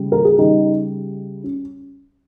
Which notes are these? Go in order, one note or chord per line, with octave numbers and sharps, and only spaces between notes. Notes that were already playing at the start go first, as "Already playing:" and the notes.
Already playing: C#3 G3
A#4
G#4
C#3 G3 D#4 G4
C#4